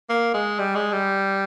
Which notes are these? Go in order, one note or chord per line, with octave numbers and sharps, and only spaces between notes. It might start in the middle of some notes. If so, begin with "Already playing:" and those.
A#3
G#3
G3
G#3
G3